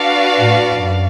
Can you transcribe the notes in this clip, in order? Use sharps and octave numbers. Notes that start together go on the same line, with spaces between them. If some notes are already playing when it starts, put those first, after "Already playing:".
Already playing: D4 F#4 B4 D5 F5
A2
F#2